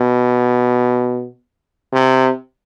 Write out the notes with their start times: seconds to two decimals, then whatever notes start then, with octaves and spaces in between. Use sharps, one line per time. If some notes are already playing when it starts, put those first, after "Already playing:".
Already playing: B2
1.92 C3